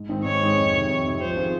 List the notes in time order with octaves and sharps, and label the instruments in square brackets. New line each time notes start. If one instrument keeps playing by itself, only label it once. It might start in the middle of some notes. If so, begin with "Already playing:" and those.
Already playing: [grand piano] G#2
D#3 G#3 C4 D#4
[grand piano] G#2 [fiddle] C#5
[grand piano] D#3 G#3 C4 D#4
F2
C3 D#3
F2
C3 D#3
[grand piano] F3 [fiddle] C5
[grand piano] C4 F4 G#4